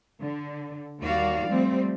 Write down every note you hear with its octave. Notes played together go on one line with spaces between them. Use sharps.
D3
D#2 G3 A#3 F#4 D5 F5
F3 G3 A3 C4